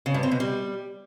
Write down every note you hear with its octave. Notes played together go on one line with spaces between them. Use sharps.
C#3
G2
C4
B2
G3